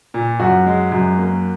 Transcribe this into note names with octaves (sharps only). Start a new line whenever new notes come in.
A#2
F#2 F#4
G#3
F#2
A#3